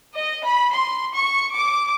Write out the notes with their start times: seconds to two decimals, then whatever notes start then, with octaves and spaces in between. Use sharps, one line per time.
0.15 D#5
0.45 B5
0.75 C6
1.15 C#6
1.54 D6